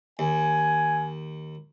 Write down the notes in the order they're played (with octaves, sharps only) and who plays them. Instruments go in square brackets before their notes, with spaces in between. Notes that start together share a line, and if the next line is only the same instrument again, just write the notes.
[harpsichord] D#2 [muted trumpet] G#5